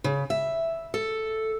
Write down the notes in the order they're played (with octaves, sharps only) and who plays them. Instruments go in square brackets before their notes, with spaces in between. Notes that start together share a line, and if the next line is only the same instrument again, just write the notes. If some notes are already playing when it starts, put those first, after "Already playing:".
[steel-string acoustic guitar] C#3
E5
A4